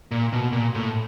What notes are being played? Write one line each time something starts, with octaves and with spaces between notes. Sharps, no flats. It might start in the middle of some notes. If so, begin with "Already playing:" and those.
A#2
B2
A#2
A2